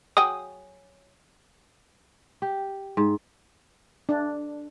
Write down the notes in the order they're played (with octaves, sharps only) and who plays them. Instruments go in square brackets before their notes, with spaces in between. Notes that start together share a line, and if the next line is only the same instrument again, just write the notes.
[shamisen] F#3 G#4 G5 [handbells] D#6
[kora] G4
G#2
[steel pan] D4